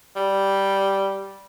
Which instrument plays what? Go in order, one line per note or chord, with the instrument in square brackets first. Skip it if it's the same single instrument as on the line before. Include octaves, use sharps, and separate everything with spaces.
[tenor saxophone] G3